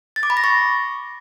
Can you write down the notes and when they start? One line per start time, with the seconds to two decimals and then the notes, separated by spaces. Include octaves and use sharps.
0.16 A6
0.23 D6
0.30 B5
0.37 A#6
0.44 C#6